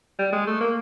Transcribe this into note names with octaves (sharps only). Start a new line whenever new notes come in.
G3
G#3
A3
A#3